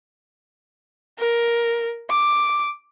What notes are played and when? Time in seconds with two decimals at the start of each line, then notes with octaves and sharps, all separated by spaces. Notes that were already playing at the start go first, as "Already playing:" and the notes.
1.19 A#4
2.10 D6